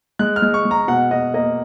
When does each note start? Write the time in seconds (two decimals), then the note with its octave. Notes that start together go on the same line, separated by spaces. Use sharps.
0.19 G#3 F#6
0.36 F6
0.42 G#3
0.54 C#6
0.65 G#3
0.71 A#5
0.88 B2 F#5
1.11 B2 D#5
1.34 A#3 D#5